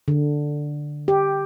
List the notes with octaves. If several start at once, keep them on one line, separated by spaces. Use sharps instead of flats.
D3
G4